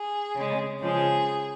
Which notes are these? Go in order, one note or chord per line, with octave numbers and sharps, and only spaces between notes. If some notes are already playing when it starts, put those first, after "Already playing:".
Already playing: G#4
C#3 G#3
C#3 F3 G#3 G#4